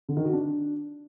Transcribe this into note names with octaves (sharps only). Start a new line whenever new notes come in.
D3
D#3
F#4
D4